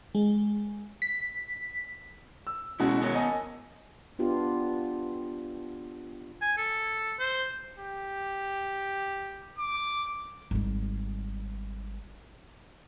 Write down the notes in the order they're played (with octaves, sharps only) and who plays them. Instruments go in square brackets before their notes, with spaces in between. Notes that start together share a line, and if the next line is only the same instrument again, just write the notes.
[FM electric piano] G#3
B6
[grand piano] E6
[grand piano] B2 G#3 F#4 [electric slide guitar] C#4 E4
[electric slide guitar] B3 A#4 C#5
[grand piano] D#5 G#5 A5
[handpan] B3 D4 F4 G4
[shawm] G#5
A4
C5
[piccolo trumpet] G4
D6
[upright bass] G#1 G3